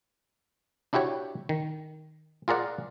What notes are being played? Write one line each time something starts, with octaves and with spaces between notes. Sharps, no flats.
D4 E4 F#4 G4 C#5
D#3
F4 G#4 A#4 D5 F#5